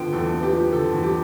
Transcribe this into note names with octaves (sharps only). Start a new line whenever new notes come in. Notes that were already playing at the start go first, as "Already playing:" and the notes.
Already playing: D3 F3 B3 G5
E2 A4
B3
G4
F3
D3 A4
E2
G4